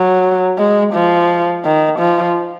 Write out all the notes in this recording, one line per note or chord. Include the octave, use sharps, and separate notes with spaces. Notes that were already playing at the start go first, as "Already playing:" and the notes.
Already playing: F#3
G#3
F3
D#3
F3